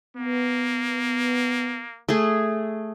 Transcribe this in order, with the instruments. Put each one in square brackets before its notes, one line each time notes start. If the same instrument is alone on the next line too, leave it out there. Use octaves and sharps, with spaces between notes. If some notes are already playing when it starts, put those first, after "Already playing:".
[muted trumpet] A#3 [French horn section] B3
[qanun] A3 G#4